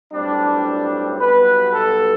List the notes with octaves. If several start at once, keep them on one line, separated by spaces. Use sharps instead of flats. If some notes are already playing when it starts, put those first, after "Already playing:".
B1 A2 G3 C4 D4
B1 B2 G3 B3 B4
A4